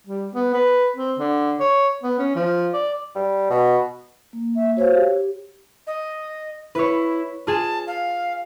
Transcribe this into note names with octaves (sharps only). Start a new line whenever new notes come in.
G3
B3
B4
C4
D3
C#5
B3
C#4
F3
D5
G3
B2
A#3
E5
F#4 C5 C#5 F5
G4
D#5
E4 B4 C#5
F4 G#4 A5
F5